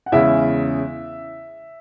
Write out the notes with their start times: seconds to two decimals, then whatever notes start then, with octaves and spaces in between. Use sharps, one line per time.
0.06 F#5
0.12 E2 C#3 G#3 C#4 E4 E5